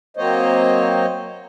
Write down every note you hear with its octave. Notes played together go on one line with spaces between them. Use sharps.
F#3 A#3 C4 C5 C#5 D#5